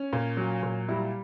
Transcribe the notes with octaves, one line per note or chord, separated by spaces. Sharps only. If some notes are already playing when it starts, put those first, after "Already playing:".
Already playing: C#4
A#2
F#3
A#2
G3 E4